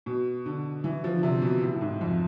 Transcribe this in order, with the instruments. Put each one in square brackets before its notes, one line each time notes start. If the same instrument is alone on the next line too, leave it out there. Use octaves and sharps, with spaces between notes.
[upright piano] B2
D3
E3
F3
D3
C3
B2
A2
A2
G#2
F2